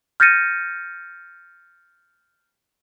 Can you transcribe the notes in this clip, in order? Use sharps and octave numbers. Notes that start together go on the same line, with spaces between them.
F6 G6 A6 A#6 C#7 D#7